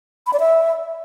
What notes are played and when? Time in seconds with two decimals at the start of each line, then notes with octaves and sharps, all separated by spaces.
0.27 B5
0.33 D5
0.40 E5